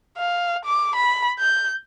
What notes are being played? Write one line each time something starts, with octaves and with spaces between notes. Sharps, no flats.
F5
D6
B5
G6